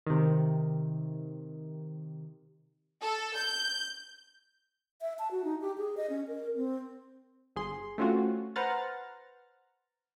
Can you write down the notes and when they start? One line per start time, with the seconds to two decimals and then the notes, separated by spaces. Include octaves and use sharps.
0.06 C3 D#3
3.03 A4
3.36 G6
5.01 E5
5.19 A5
5.31 F#4
5.44 D#4
5.62 G4
5.78 G#4
5.97 D#5
6.10 C#4
6.28 A#4
6.56 C4
7.56 G1 G#4 C6
7.98 A3 C4 C#4 F4 F#4
8.56 B4 C5 F#5 A#5 F6 A6